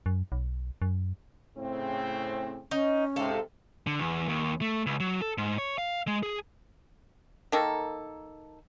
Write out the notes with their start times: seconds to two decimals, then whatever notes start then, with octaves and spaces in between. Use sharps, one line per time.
0.06 F#2
0.32 B1
0.82 F#2
1.57 A2 C#3 C4
2.71 C#4 D#4
3.16 G#2 C3 A4 F5
3.87 D3
3.99 E2
4.29 D#2
4.61 A3
4.86 C#2
5.00 F#3
5.22 A4
5.38 G#2
5.58 C#5
5.78 F5
6.07 G#3
6.23 G#4
7.52 D#3 A#3 A4